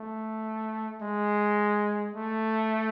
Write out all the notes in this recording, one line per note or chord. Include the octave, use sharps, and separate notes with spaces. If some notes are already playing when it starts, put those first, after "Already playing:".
Already playing: A3
G#3
A3